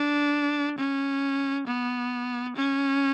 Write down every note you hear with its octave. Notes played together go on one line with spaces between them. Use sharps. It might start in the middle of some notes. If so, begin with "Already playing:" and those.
Already playing: D4
C#4
B3
C#4